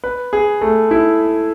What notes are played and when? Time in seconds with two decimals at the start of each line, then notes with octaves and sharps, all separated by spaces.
0.04 B4
0.33 G#4
0.61 A3
0.91 E4